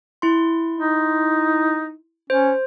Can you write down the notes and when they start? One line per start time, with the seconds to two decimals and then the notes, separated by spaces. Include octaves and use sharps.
0.22 E4 C6
0.78 D#4
2.30 C#4 C5